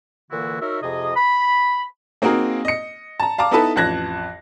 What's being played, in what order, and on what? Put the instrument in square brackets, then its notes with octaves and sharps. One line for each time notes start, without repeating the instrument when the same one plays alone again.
[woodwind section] A#2 D3 E3 A#3 E4 F#4
D#4 F#4 A#4 C#5 E5
F2 C3 G#4 D#5
B5
[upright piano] A#3 C4 D#4 F#4 G#4 A#4
D#5 C#7
A5 A#5
F5 A5 A#5 D6
B3 D#4 E4 A4 B4 A5
A1 F2 A5 F#6 G#6 A#6